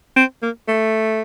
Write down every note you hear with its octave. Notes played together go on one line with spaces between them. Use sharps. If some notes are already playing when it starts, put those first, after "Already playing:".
C4
A#3
A3